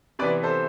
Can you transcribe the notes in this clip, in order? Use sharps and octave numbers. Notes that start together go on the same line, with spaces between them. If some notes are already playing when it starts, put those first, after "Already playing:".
C3 E3 B3 B4 D5
A4 C5